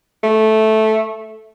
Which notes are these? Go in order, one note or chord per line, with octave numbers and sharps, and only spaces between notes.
A3